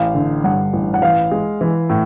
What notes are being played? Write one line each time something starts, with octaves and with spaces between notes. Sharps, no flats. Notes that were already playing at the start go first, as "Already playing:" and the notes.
Already playing: A1 F5
D3
G2 F#5
A1
F#5
E3 F5
G#3
E3
A2